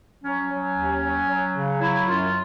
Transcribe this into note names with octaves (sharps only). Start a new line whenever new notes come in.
F#3 C#4
F#3
D#2
F#3
F#3
C#3
F#3 E4
F#2 F4